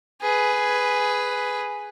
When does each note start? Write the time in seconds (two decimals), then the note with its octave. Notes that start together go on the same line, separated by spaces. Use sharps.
0.22 G#4 B4